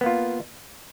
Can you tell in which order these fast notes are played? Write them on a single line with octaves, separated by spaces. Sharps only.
B3 A#3 F4